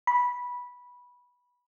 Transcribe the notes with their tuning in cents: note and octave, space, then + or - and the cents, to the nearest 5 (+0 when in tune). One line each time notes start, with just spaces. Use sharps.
B5 -10